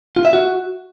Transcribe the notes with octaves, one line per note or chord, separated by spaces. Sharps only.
F4
E5
F#4